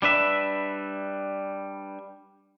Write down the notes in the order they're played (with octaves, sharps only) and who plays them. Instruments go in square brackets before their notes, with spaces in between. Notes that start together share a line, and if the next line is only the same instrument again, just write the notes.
[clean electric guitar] G3 D4 B4 E5